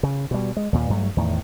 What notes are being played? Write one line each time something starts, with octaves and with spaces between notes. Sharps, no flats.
C#3
B2 G3
G#3
D#2 A#2
G2 F#3 A3
E2 A2 D#3